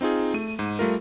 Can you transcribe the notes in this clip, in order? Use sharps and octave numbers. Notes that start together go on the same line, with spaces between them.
C4 D#4 F4 G#4
A3 D#7
G#2
G3 A3 F4 A#4